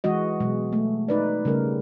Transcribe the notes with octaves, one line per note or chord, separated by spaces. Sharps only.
E3 G#3 F#4 D#5
B2 F#3 G#3
A3
D#4 B4 D5
C#3 G3 A3 A#4